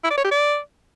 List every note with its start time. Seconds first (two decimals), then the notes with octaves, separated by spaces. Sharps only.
0.04 E4
0.11 D5
0.17 C#5
0.24 G4
0.31 D5